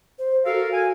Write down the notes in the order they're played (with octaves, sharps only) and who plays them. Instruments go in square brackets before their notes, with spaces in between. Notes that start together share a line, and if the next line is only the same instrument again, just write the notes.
[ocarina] C5
[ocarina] F#4 [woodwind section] A4 A#4 F5
[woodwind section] G#5